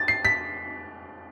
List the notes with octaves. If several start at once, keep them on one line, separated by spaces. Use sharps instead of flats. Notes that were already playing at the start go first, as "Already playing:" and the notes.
Already playing: A6
C7
B6